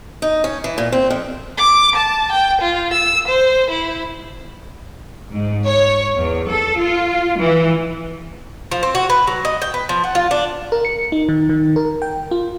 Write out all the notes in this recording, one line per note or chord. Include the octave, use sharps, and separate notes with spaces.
D#4
C#4
E3
A#2
C4
F2
D6
A5
G5
F4
E6
C5
E4
G#2
C#5
E2
A4
F4
E3
F3
C4
F#4
B4
F#3
D#5
G5
B4
F3
F#5
F4
D4
A#4
C#7
D#4
D#3
D#3
A#4
G5
F4